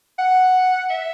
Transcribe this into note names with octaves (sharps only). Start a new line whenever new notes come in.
F#5
E5